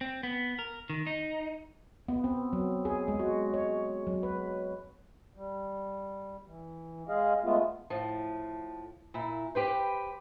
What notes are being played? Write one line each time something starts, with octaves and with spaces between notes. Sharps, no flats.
C4
B3
A#4
D#3
D#4
B3
C4
F#3
G#4
G#3
F#4
C#5
F#3
B4
G3
E3
G#3 G#4 D#5 F5
G#3 A3 B3 F4
A2 F3
A#2 E4
G4 B4 C5